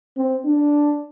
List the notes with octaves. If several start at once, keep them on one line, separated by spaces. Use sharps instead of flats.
C4
D4